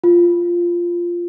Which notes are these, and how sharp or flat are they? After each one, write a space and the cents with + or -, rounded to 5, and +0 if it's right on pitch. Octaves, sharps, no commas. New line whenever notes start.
F4 -5